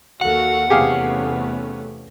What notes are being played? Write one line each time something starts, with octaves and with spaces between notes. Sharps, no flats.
D#2 F#4 A4 F5 F#5
E2 C3 A3 B3 C#4 G4 G#4 F5